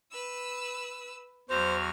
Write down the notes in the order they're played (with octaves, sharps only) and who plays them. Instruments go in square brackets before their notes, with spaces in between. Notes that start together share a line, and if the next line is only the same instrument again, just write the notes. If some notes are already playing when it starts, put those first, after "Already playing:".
[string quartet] B4 E6
[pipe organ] E2 F#4 [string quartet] F#3 F6 [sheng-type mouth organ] C5